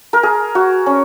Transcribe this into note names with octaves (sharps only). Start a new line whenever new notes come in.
A#4
G#4
F#4
C#4